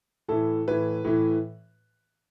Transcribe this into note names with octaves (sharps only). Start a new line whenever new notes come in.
A2 E3 A4
A2 E3 B4
A2 E3